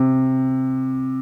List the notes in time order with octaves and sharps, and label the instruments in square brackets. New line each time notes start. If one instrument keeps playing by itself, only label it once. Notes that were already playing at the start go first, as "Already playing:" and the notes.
Already playing: [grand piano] C3